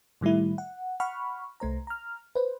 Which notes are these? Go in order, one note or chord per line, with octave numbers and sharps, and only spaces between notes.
A2 D#3 G3 A3 E4
F#5
F#5 B5 C#6 F6
C2 A3 C5 A#5
A#5 F6
B4 C5